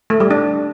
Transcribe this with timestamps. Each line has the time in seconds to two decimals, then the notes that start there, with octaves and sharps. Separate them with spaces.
0.10 A3
0.20 G3
0.31 D4